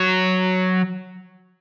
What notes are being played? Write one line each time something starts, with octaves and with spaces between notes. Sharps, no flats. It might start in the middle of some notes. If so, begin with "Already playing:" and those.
Already playing: F#3